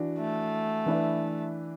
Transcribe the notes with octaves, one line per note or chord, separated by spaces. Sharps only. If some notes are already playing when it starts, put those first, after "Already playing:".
Already playing: E3 D4 F#4
A3
E3 D4 B4 E5